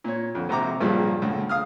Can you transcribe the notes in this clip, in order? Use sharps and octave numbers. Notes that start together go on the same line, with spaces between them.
A#2 C#5
F2 D3
G#1 C3 A#5 D6
G#1 G2 A#2 C#3 F3 G3
C#2 D3
F5 D#6 F6